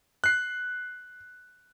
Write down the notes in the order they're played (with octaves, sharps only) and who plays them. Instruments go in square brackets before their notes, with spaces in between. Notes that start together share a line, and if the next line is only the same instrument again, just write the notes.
[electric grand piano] F#6 C7